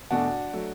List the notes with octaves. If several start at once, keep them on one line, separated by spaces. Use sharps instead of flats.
E2 B2 A3 D4 F#4
F#3 A3